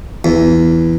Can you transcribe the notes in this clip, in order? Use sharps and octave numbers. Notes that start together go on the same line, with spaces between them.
E2